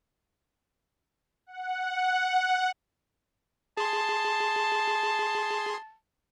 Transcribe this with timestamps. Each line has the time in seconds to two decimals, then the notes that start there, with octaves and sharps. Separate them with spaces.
1.46 F#5
3.77 G#4 A5 C6